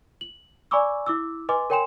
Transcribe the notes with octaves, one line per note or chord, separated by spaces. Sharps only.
F#7
D5 G#5 B5 C#6 D6 E6
E4 D6 E6
B4 D#5 G#5 C6 D6
A#4 C#5 G5 G#5 C6 E7